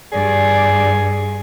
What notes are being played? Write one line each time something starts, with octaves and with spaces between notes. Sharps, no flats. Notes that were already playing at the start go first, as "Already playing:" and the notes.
G2 G#4 D5